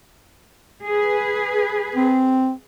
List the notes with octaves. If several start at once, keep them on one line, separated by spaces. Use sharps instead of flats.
G#4 B4
C4